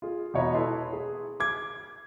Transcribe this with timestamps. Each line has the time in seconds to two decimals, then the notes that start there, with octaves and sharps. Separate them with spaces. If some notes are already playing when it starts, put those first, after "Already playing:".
0.02 F4 G#4
0.34 E1 F#4 C#5 D#5 A#5 B5
0.53 E4 A4 B4 A5 A#5 C6
0.93 G#4
1.40 D6 G#6